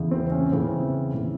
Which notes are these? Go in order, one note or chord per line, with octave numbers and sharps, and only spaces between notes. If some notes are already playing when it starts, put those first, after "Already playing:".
Already playing: E2 C#3 E3
C4
C#4
E2 C#3 E3 C4
C#3 E3